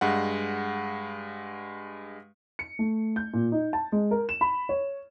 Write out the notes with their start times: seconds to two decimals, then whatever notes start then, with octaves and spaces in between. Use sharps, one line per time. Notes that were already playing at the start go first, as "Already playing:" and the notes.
0.01 G2 G#3 F#5
2.59 C#7
2.79 A3
3.16 G6
3.33 A#2
3.52 D#4
3.73 A5
3.92 G#3
4.11 A#4
4.29 E7
4.41 B5
4.69 C#5